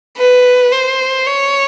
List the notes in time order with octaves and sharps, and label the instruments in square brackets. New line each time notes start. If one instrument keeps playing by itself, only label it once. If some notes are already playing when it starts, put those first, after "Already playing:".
[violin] B4
C5
C#5